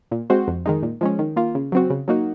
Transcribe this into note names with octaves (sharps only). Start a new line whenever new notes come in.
A#2
G#3 C4 F#4 C5
F2
D#3 G#3 D#4
A#2
F3 G#3 C#4
D#3
A#3 F4
C#3
F#3 C4 F#4
C#3
F#3 A#3 D#4 F#4